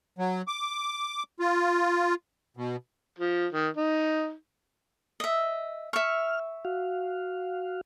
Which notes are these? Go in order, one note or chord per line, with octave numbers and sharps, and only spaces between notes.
F#3
D6
F4
B2
F3
D#3
D#4
D#5 E5
E5 C#6 F6
F#4 F5